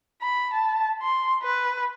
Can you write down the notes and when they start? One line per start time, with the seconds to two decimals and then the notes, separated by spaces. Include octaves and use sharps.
0.22 B5
0.53 A5
1.02 C6
1.43 B4